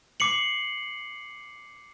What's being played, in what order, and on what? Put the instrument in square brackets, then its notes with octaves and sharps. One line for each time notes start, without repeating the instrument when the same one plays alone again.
[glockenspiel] D6 C7 C#7 F#7